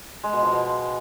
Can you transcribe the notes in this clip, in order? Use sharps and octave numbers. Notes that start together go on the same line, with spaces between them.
G#3
B2
F3
B2